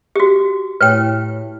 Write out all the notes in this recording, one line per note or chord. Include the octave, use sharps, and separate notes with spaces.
F#4 G4
A2 B4 C#5 G5